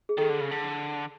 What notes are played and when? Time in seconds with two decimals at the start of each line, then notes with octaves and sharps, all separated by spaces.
0.09 G#4
0.18 D#3 A4
0.30 D3
0.41 C#3
0.51 D3